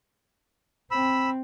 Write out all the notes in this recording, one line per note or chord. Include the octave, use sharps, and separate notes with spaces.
C4 B5 E6